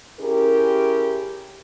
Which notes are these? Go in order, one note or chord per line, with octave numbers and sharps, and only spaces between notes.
C#4 E4 G4 G#4 A#4